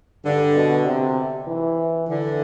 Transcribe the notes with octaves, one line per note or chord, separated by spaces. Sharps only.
G2 D3
B2
C3
E3
D3 E3